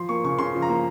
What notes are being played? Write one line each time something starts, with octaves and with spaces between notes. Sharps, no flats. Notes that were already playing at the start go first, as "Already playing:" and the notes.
Already playing: F3 C6
A#3 C#6
C#3 C#6
C#3 C6
F3
A#5
A#3